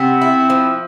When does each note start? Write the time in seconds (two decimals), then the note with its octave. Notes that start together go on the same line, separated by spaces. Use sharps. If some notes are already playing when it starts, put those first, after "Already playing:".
Already playing: C3 B3 C4
0.21 E4
0.50 F3